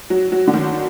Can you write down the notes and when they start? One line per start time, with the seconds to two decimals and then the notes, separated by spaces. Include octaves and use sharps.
0.10 F#3
0.32 F#3
0.47 D3
0.54 D#3